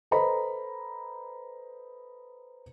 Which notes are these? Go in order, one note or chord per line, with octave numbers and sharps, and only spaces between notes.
A4 B4 C5 D#5 A#5 B5